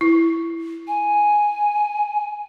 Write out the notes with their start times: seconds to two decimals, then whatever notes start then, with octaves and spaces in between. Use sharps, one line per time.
0.01 E4
0.88 G#5